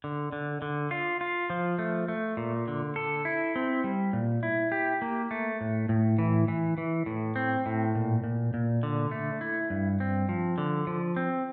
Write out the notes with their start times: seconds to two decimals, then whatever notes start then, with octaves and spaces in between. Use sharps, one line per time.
0.04 D3
0.32 D3
0.62 D3
0.91 F4
1.21 F4
1.50 F3
1.79 A3
2.08 A3
2.37 A#2
2.68 D3
2.96 A4
3.25 E4
3.56 C4
3.84 G3
4.13 A#2
4.43 E4
4.72 G4
5.02 A#3
5.31 A3
5.61 A2
5.89 A2
6.19 E3
6.48 E3
6.78 E3
7.06 A2
7.36 C4
7.66 A2
7.95 A#2
8.24 A#2
8.54 A#2
8.83 D3
9.11 A3
9.41 E4
9.70 G2
10.00 C4
10.29 F3
10.58 D3
10.87 F3
11.16 C4